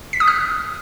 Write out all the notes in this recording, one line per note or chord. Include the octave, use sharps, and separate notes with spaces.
B6
D#6
F6